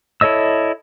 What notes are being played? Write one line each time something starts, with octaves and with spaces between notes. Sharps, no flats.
E4 A4 C#5 D#5 E6